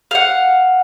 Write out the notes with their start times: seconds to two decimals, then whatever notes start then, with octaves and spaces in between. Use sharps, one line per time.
0.11 F5 F#5